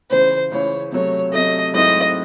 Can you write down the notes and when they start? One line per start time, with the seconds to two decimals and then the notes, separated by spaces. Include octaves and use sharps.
0.10 C#2 C#3 E3 C5
0.51 C#2 C#3 E3 C#5
0.92 C3 F#3 A3 C#5
1.33 C3 F#3 A3 D#5
1.74 G#2 F#3 A3 C4 E4 D#5